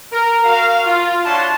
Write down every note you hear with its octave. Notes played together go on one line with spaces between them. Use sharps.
A#4
F#4 A#4 F5
F4
D4 E4 F#4 C#5 A5 C6